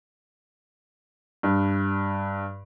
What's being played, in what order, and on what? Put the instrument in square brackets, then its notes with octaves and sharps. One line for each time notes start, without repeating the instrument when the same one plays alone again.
[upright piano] G2